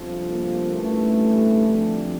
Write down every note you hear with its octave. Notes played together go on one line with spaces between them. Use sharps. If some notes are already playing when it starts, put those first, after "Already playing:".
Already playing: G1 F2 C3 F3
A#3
A1 G2 E3 A3
G1 F2 D3 G3